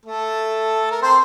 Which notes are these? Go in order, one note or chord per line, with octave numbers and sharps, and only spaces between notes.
A3 A4
A#4
C4 C5